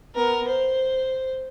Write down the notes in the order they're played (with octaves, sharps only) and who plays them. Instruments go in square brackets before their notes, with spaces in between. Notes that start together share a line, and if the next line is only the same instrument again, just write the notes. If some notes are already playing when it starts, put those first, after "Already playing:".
[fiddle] B3 A#4
C5